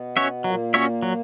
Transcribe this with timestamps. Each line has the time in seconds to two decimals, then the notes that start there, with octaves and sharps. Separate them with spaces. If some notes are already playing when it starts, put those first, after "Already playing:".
Already playing: B2 B3
0.17 C#4 F#4 C#5 E5
0.44 A#2 F#3 A#3
0.74 C#4 F#4 C#5 E5
1.03 F#3